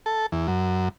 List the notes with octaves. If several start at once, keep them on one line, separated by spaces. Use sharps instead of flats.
A4
E2
F#2